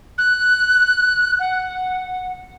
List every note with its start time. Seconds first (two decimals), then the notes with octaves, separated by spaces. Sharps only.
0.18 F#6
1.39 F#5